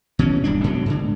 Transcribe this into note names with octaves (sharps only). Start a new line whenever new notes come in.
B2 E3 C#4
D#1 G2 D4
G#2 B2 D3 F#3
G#2 D3